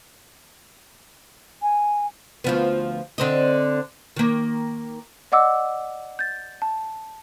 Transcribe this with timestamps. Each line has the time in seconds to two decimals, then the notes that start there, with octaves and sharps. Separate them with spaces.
1.62 G#5
2.44 D2 F3 B3
3.18 D3 C4 D#5
4.16 D#3 A#3
5.32 D5 D#5 F#5 D6 E6
6.19 G6 A6
6.62 A5